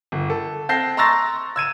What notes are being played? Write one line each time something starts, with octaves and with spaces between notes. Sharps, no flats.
G1
A4
C4 A5 G6 A#6 C7
A#5 C6 C#6 E6 A6 A#6
E6 G#6 D#7 E7